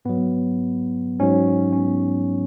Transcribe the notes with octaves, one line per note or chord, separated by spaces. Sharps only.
G#2 F#3 B3
G#2 F#3 C#4
C#4
B3